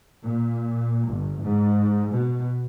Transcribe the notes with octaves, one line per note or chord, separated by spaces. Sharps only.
A#2
G1
G#2
B2